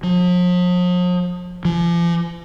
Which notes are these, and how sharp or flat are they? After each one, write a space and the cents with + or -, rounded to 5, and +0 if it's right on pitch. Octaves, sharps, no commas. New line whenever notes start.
F3 +45
F3 -40